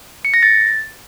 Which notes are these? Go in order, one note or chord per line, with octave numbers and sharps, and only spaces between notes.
C#7
A#6
A6